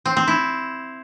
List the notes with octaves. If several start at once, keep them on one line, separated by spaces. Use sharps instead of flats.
C4
C4
E4